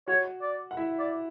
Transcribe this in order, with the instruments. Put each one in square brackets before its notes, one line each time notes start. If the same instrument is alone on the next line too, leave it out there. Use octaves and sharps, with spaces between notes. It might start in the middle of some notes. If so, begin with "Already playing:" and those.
[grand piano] F#4 F#5 [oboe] C#5
[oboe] D5
[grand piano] F#5
E4 E5
[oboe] D5